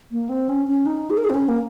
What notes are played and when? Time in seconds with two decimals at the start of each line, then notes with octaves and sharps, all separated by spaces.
0.12 A#3
0.29 C4
0.49 C#4
0.67 C#4
0.86 D#4
1.10 G#4
1.17 A#4
1.24 G#4
1.30 C4
1.34 C#4
1.48 A#3